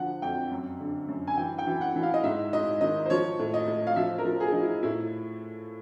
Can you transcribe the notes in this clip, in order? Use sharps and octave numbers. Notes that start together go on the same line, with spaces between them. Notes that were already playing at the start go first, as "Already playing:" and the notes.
Already playing: D3 F3 F#5
F2 G5
F#2
D3
F#2
G#5
E3 G5
G5
E3
F#5
E3
F5
D#5
G#2 E5
G#2 D#5
D#3 D#5
C5
F3 C#5
A2
D#5
A2
F5
F3 E5
A#4
F3
G#4
F3 D#4
E4
A2 E4